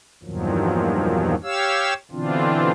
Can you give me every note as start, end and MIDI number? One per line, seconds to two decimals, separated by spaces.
0.23 1.35 40
0.23 1.35 43
0.23 1.35 46
0.23 1.35 51
0.23 1.35 53
0.23 1.35 54
1.43 1.93 67
1.43 1.93 73
1.43 1.93 77
1.43 1.93 88
2.11 2.71 47
2.11 2.71 50
2.11 2.71 52
2.11 2.71 60
2.11 2.71 62
2.11 2.71 65